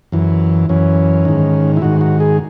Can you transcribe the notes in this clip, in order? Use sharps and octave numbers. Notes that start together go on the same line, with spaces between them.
F#2 E3
F#2 E3 C#4
G#2 D#3
E4
G#2 D#3 F#4
F#4
G#4